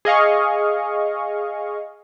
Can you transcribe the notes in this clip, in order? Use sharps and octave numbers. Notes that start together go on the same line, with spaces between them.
G#4 D#5 F5 C#6